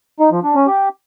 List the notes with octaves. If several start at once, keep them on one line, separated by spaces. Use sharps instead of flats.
D#4
F3
D4
C#4
G4